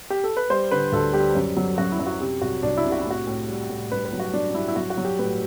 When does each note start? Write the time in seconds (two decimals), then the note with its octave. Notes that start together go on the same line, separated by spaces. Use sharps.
0.10 G4
0.24 A4
0.37 B4
0.50 G3 C5
0.71 D3 B4
0.92 D2 A4
1.13 G3 G4
1.35 F#2
1.57 F#3
1.78 F#2 F#4
1.92 E4
1.99 F#2
2.07 F#4
2.20 C3 G4
2.41 C2 F#4
2.63 C2 D4
2.77 E4
2.85 C3
2.92 F#4
3.01 E4
3.06 A2 F#4
3.27 A2
3.48 G3
3.69 A2
3.91 G2 B4
4.05 B4
4.12 F#3
4.20 F#4
4.33 F#3 D4
4.50 D4
4.54 G2 E4
4.68 E4
4.76 F#3 F#4
4.90 F#4
4.97 F#3
5.05 G4
5.19 A2 B4